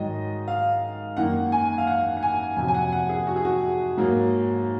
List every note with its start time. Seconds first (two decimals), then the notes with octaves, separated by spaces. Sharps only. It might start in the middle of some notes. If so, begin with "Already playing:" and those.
Already playing: G#2 D#3 F#3 D#5
0.48 F5
1.17 F#2 D#3 A#3 F#5
1.52 G#5
1.78 F5
1.87 F#5
2.17 F#5
2.23 G#5
2.56 F2 C3 F#3 G#5
2.68 G#5
2.74 F#5
2.92 F#5
3.09 G#4
3.27 F#4
3.36 G#4
3.45 F#4
3.97 G#2 F#3 A#3